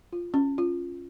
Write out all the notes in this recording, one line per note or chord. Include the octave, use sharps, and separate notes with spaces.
F4
C#4
F4